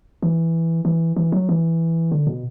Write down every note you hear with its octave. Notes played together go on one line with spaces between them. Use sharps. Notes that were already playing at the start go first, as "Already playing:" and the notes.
E3
E3
E3
F#3
E3
D3
B2